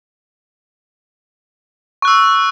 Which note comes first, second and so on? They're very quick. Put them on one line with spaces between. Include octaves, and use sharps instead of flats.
C#6 F#6 E6